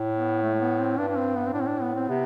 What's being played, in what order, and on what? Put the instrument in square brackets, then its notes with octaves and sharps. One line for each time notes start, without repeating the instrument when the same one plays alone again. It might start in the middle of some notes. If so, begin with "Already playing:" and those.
Already playing: [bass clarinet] A2
[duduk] B3
A3
A3
B3
C4
[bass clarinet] G2 [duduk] D4
[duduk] D4
C4
B3
C4
[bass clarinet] A2 [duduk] D4
[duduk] C4
D4
B3
C4
[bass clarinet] C3 [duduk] B3